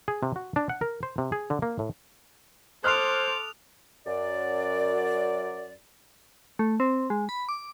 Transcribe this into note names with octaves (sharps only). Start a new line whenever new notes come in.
G#4
C3
F#4
D4
F#5
A#4
C5
C3
G#4
D3
A#3
A2
A4 C5 C6 D6 D#6 F6 F#6 F7
F#2 D5
A3
C4
G#3
B5
D6